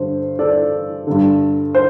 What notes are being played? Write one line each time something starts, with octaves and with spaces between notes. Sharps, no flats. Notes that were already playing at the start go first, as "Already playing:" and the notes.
Already playing: G2 D3 C5
A4 D5
G2 D3
C5